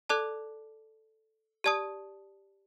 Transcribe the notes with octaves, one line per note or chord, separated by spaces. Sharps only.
A4 D5 A5 D6 F#6
G4 D5 A5 D#6